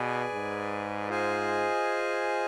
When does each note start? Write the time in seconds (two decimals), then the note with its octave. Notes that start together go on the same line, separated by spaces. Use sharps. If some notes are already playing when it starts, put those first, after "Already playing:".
Already playing: B2 G#4 B4 D5 G#5
0.34 G#2
1.09 F4 G#4 C5 D#5 G#5